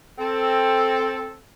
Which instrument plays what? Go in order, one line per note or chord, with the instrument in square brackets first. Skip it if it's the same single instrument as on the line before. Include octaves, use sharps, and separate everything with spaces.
[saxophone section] C4 A4